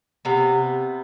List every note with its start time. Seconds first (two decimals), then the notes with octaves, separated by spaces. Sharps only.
0.25 C3 B3